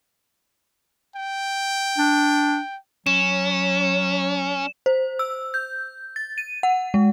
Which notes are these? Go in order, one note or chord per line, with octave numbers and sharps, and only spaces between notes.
G5
D4
F#3 C#4 E7
C5
E6
G6
A6
D#7
F#5
G#3